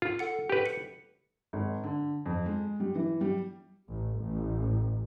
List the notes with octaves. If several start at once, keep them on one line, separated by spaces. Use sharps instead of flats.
F4
A4 F#5 C#7
G4 B4
C#7
G#1
D3
F2
G#3
G3
E3
G3
A1
A1